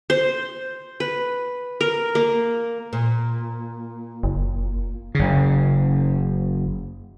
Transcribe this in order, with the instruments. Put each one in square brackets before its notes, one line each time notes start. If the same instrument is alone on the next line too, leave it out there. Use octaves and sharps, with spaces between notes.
[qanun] C5
B4
A#4
A#3
[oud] A#2
[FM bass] F#1
[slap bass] F#1 C#3